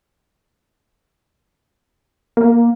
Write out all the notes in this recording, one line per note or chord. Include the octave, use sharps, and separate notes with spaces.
A#3